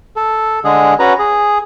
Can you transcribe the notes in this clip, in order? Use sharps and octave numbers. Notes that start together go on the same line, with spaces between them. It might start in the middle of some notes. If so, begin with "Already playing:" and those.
A4
D3 G#3 G#4
C#4 F#4 B4 A#5
G#4